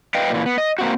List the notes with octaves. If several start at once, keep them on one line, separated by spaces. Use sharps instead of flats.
B4 D#5 F5 G5
A#2 E3
B3
D#5
A#3 C4 F#4